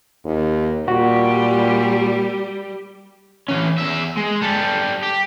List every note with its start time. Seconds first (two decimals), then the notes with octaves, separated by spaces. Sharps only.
0.25 D#2
0.88 A#2 G3 F#4 G4
3.48 E3 C#4
3.78 E2 E5
4.17 G#3
4.42 G3 A4
5.02 G4